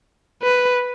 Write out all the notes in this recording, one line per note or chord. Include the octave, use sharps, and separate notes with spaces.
B4